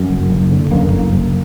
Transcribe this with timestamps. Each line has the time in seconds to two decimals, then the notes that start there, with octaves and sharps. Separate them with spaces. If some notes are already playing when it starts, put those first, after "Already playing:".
Already playing: F#2
0.10 F#1
0.30 F#1
0.51 D3
0.71 F#2 A#3
0.93 F#1
1.13 F#1